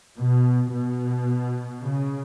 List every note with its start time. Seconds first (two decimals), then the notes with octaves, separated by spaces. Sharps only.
0.19 B2
0.73 B2
1.81 C#3